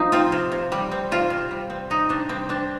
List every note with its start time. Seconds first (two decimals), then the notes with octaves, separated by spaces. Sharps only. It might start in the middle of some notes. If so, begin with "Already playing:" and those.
Already playing: F3 D#4
0.12 C4 F4
0.32 C3
0.52 C3
0.72 G3
0.92 C4
1.11 C3 F4
1.30 C3
1.51 G3
1.70 C4
1.90 C3 D#4
2.09 C3 D4
2.29 G3 C4
2.49 C4 D4